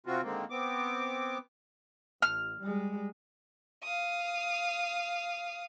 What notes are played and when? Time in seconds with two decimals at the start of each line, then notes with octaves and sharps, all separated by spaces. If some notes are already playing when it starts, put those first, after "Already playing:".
0.06 C3 C4 F4 F#4
0.23 D3 D#3 G#3 A#3 C4
0.50 B3 C4 D6
2.22 A1 F6
2.60 G3 G#3
3.83 F5 D#6